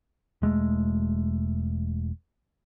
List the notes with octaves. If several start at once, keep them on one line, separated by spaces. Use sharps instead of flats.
E1 G#3 A3